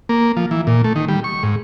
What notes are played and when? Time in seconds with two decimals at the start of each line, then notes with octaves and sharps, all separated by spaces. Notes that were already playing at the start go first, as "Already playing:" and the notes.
0.09 A#3
0.37 F3
0.51 E3
0.67 A#2
0.84 A3
0.96 D#3
1.08 G3
1.24 C#6
1.43 G#2